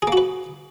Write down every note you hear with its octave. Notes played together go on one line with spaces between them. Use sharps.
A#3 F#4 G#4 B4